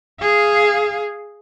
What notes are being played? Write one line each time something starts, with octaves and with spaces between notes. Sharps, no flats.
G#4 F5